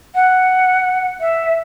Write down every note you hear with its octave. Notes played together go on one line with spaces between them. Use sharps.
F#5
E5